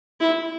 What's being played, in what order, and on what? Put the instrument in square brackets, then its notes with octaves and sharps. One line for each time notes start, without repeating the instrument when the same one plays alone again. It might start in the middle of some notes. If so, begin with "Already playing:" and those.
[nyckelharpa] E4